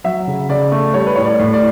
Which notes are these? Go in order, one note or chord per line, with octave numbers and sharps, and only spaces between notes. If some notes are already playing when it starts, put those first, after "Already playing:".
F#3 E5
C#3
C#3 D5
A3
G3 C#5
B4
A2 C#5
D5
A2
D5